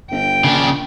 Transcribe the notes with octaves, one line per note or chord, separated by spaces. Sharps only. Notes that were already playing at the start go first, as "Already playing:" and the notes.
G1 G5
A#1 C#3 D4